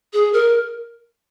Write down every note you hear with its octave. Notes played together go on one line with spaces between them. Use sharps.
G#4
A#4